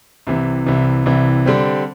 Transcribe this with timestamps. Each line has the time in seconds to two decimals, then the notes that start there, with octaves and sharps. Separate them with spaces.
0.27 C2 C3 E3
0.66 C2 C3 E3
1.06 C2 C3 E3
1.46 D3 G3 C4